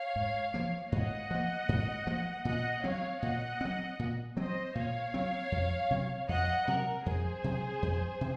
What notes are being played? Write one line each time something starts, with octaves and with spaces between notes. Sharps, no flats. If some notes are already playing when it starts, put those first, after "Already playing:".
Already playing: C#5 F5
G#2
F3 A#3
G#2 D#5 F#5
F3 A#3
G#2
F3 A#3
A#2 D#5 F#5
F#3 C4 C#5 F5
A#2 D#5 F#5
F#3 C4
A#2
F#3 C4 C5 D#5
A#2 C#5 F5
F#3 C4
F2
C3 F#3
F2 D#5 F#5
C3 F#3 A#4
F2 G#4 C5
C3 F#3
F2
C3